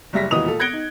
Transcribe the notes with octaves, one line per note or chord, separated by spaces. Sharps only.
F#1 G3 E5 A#6 B6
E1 D#2 E3 D#5 D#6 F7
A#2 A4
F#6 G#6 A#6 C#7 D7 G7
D#4